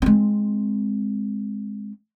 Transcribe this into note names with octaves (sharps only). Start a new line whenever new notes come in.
G#3 C4